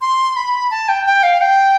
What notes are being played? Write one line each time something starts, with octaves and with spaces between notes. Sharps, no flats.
C6
B5
A5
G5
G5
F5
G5